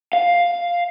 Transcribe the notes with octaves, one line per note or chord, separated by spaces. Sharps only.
F5